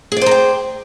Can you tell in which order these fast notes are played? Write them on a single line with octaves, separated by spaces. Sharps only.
G#4 D5 C5 A#5 G5